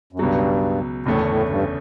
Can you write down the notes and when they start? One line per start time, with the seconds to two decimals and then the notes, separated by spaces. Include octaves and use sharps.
0.13 F#2
0.19 C#2 G2 B2 F#3
1.06 F#1 E2 A2 D3 A3 C#4
1.27 A2
1.49 G2